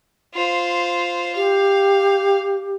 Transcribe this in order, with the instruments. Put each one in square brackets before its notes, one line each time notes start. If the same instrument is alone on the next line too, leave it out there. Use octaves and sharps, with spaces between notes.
[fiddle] F4 C5
[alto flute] G4 [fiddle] F5